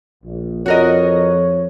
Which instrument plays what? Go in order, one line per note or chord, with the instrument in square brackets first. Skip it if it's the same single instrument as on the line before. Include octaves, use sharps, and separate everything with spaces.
[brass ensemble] A#1
[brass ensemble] F2 C#5 [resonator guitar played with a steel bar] F#4 A#4 D#5